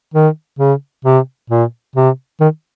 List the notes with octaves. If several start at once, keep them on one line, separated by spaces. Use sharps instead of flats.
D#3
C#3
C3
A#2
C3
D#3